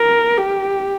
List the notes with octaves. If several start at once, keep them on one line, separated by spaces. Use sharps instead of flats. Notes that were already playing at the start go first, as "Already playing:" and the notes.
Already playing: A#4
G4